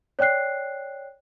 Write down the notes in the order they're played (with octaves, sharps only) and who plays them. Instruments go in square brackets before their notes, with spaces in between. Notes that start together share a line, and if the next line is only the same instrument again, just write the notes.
[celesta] C#5 D5 G5 F#6 C7